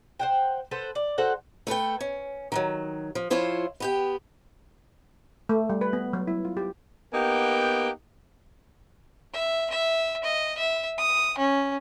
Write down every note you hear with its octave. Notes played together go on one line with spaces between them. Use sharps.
C5 F#5 G5
A4 B4 C5 F#5
D5
F#4 A4 C5 F#5
A3 A4 B4 G5
C#4
D#3 E3 F#3
F3
F3 E4 F4 C5 C#5
B3 G4 G5
A3
G3
B4
B3
F#3
E4
F4
G4
A#3 B3 D#4 G4 F#5 G5
E5
E5
D#5
E5
D#6
C#4